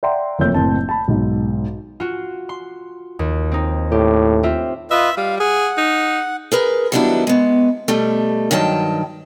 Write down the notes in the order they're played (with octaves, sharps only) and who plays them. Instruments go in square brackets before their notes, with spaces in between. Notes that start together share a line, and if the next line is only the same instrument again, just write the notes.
[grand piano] D5 E5 F#5 G5 A#5 C6
F#1 F2 A3 C#5 E6 G6
F#1 A2 C4 A5
A5 B5
B1 G#2
[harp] F4 F#4
C6
D#2
C4 D#4
[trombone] A2 [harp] G4
[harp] C4 F4 E5
[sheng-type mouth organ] F4 B4 D#5 [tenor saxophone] E5
[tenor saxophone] G3 [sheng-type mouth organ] F5
[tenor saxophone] G#4 [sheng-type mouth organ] F#5
[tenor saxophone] D#4
[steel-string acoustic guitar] G#4 A#4 B4
D#3 F#3 G3 B3 D4 E4
G#3 B3
B2 G3 A3
G2 D#3 F#3 G5 A5